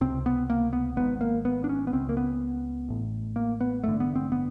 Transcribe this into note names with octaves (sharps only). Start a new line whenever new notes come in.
C#2 C3 C4
B3
A#3
B3
G#1 G#2 B3
A#3
B3
D4
C#4
B3
C#2 C#3 C4
A#3
B3
A1 A2
A#3
B3
A1 G2 D3 A3
B3
C4
B3